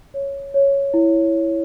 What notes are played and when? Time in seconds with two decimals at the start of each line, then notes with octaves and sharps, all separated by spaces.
0.14 C#5
0.54 C#5
0.94 E4